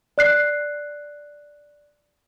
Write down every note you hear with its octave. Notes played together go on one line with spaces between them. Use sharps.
D5 F#6 C7